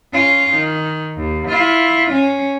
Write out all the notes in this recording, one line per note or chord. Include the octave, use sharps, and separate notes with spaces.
C#4 F4
D#3
D#2
E4 F4
C#4